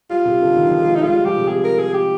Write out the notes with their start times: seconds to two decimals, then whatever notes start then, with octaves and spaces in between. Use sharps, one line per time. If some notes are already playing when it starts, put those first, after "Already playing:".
0.10 G3 F4
0.25 C3
0.41 D3
0.56 D#3
0.68 F3
0.80 G#3
0.91 G3 D#4
1.02 G#3 F4
1.14 G3
1.25 F3 G4
1.37 C3
1.48 C3 G#4
1.64 A#4
1.78 G#4
1.94 G4